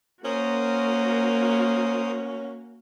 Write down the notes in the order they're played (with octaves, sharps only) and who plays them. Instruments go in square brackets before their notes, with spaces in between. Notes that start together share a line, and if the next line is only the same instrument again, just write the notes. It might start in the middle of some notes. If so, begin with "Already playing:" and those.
[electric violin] A#3 F#4 [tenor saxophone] C#4 [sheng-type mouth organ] A#4 C5 D#6